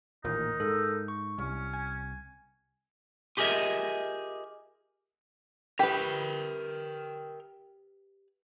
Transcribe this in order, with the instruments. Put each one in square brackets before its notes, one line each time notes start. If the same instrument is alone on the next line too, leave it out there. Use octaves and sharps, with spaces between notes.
[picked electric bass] A1 D#2 A#2 [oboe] D#4 [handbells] A#4
[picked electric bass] G#2 [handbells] A4 A#4
[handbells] C#6
[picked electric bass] C2 [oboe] C#4
[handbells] G#5 G#6
[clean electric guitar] F4 G4 G#4 A#4 D#5 E5
[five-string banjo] G4 B4 [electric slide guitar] A#4 E5 G5